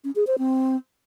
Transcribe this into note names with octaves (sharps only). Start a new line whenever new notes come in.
C#4
G#4
C5
C4